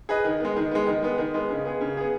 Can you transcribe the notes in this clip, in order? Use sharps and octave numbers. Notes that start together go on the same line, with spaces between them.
G#4 B4 D#5
D#3
G#3 B3
D#3
G#3 B3
D#3
G#3 B3
D#3
G#3 B3
C#3
B3 G#4
C#3
B3 G#4